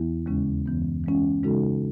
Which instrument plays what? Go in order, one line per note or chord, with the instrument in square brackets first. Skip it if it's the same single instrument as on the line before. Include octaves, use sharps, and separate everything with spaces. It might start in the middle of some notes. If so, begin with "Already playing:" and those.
Already playing: [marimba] E2 E3 B3 E4
D#2 C#3 G#3 C#4
F#2 E3 B3
E3 G#3 C#4
C#3 G#3 D#4 F#4 A4